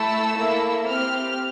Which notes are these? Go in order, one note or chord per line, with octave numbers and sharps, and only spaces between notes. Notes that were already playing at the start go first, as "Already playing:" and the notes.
Already playing: A3 E4 A4 E6
A#3 E4 A4
C4 G4 F6